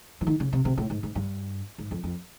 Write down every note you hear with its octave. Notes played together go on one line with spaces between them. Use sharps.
E3
D#3
C#3
C3
C3
A2
G#2
G#2
G2
G#2
F2
F2